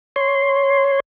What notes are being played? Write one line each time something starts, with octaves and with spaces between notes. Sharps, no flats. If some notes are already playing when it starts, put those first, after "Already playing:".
C#5 C6